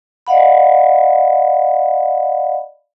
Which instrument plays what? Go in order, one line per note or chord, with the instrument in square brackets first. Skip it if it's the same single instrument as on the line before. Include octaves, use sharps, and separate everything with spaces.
[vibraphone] D5 D#5 F5 F#5 B5